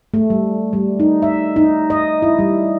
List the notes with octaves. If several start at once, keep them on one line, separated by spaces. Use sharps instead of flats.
A3
G3
G3
D#4
E5
D#4
D#5
E4
G3